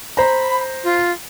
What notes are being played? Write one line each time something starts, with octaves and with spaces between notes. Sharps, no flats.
C5 A#5 B5
F4